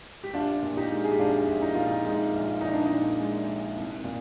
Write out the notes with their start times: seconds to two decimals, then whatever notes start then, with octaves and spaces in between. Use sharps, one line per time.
0.24 G4
0.33 A#1 D4 F4
0.63 A#2
0.77 D#4 G4
0.90 G#3
1.04 G#4
1.12 G4
1.19 A#1 D4 F4
1.48 A#1
1.62 D#4
1.75 A#2 F4
1.87 D#4
2.04 G#3 D#4
2.34 A#1
2.48 F4
2.61 A#1 D#4
2.73 D4
2.86 A#2 D#4
3.18 G#3
3.47 A#1
3.75 C2
4.04 A#2